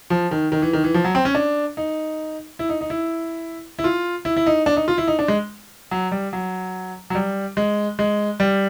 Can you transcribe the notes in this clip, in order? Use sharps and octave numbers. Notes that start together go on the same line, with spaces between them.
F3
D#3
D#3
E3
D#3
E3
F3
F#3
C4
C#4
D4
D#4
E4
D#4
D#4
E4
E4
F4
E4
E4
D#4
D4
D#4
F4
E4
D#4
D4
G#3
F#3
G3
F#3
F#3
G3
G#3
G#3
G3